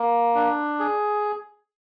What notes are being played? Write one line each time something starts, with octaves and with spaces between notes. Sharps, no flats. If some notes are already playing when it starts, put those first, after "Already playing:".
Already playing: A#3
D4
G#4